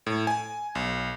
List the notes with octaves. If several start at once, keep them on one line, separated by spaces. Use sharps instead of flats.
A2
G#5
B1